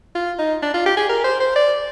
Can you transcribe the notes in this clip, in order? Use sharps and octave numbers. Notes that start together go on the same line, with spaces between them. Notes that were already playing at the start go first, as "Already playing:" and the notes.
F4
D#4
D4
F4
G4
G#4
A#4
C5
C5
D5